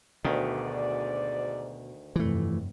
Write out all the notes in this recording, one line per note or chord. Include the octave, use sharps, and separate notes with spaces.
D2 G#2 B2 D#3 D5
F1 G2 E3 A3